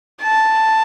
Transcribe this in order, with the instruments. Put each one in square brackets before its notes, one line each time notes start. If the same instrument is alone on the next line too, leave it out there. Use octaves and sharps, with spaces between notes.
[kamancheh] A5